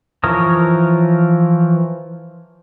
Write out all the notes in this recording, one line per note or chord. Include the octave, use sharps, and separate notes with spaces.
E3 F3 A#4 C#5 D#6